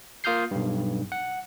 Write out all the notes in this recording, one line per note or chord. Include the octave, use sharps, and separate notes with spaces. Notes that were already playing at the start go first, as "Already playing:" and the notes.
A#3 F4 D#6 F6 G6 C7
B1 G2
F#5